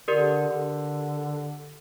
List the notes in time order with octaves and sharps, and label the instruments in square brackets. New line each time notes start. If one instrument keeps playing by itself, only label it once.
[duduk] D3 [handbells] G4 A#4 D5
[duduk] D3